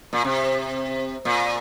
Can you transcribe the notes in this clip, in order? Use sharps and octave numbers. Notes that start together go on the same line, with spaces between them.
A#2
C3
A#2